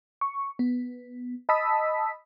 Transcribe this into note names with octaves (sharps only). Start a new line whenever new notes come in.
C#6
B3
D#5 A5 B5 D#6 E6 B6